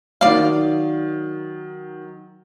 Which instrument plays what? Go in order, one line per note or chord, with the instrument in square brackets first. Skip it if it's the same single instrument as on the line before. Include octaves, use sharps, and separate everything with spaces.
[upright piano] D#3 F#3 [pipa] D5 F5